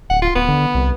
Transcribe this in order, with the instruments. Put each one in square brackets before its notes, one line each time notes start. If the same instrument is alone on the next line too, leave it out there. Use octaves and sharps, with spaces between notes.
[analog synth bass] D1 [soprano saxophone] F#5
[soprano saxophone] F4
[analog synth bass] D1 [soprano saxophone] B3
[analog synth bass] D3
C2